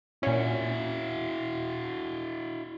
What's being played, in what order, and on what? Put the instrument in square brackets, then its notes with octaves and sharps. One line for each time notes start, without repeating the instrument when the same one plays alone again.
[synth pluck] A#2 C#4 [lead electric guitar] E4 F#4